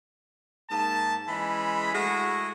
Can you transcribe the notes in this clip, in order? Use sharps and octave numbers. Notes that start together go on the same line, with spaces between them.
G#2 A#3 A5
E3 G#3 C#4 B5
G#3 A3 E4 F#4